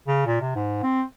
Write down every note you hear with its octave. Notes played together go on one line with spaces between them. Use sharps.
C#3
A#2
C3
G#2
C4